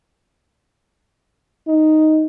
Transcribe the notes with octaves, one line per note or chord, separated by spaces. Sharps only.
D#4